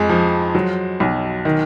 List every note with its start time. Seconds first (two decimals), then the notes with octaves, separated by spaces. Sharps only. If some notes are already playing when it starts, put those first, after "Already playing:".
Already playing: F2 G#3
0.10 F3
0.55 F#3
1.00 B1
1.45 D#3